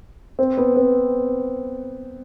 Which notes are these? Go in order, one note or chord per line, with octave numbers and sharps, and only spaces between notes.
C4
B3
C4